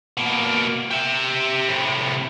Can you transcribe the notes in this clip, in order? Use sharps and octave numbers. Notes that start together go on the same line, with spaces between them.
B2 A#3
G4 E5
A2 C3